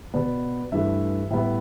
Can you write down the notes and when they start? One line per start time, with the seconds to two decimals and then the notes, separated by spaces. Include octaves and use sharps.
0.14 B2 B3 D5
0.72 G2 E3 A3 E5
1.30 A2 G3 B3 E5